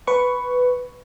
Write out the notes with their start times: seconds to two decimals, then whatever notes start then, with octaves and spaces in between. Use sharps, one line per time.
0.07 B4 C#6